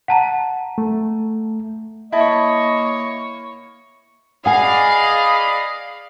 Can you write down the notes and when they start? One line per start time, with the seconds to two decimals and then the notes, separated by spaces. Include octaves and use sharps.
0.08 F#5 A5 A#5
0.78 A3
2.12 A#3 E4 C#5 D#5 A5
4.46 G#4 B4 D5 D#5 F5 F#5 G#5 B5